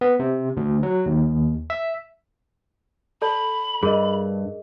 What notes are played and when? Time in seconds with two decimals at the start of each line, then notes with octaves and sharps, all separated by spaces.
0.01 B3
0.19 C3
0.57 D2
0.83 F#3
1.06 D#2
1.70 E5
3.22 A4 D5 A5 B5
3.83 G2 G#4 A#4 D#5